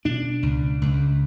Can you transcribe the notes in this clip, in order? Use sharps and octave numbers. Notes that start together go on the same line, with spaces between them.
B2 D4
C#2
C#2